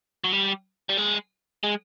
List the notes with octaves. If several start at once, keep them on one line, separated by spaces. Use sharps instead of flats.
F#3
G3
G3
G#3
G#3